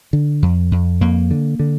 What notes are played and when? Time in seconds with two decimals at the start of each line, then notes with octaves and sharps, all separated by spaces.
0.13 D3
0.42 F2
0.72 F2
1.01 F2 A#3
1.31 D3
1.59 D3